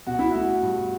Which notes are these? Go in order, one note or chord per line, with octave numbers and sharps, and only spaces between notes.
B2 F#4
E4
A3 F#4
G2